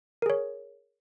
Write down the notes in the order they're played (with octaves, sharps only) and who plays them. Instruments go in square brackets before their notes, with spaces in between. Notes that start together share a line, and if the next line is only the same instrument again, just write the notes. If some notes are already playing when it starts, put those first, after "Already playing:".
[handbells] A#4
G#4
C#5